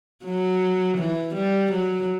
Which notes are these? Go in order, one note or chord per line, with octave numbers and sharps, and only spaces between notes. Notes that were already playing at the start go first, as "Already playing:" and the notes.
F#3
E3
G3
F#3